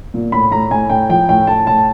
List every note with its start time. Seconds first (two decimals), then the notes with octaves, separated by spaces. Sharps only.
0.14 A#2
0.32 A2 B5
0.51 A2 A#5
0.71 A2 G#5
0.90 A2 G5
1.09 F3 G5
1.29 A2 G5
1.47 A2 A5
1.67 A2 A5